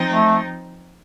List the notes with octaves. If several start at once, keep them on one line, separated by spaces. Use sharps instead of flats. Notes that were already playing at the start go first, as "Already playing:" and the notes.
Already playing: F3 C4 D#4
A3